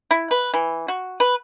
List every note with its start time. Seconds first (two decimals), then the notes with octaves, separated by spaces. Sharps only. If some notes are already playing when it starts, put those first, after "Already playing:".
0.11 E4
0.31 B4
0.54 E3
0.88 F#4
1.20 B4